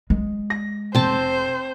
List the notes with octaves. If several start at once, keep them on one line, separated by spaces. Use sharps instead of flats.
G#3
A#6
F1 C4 C5 A5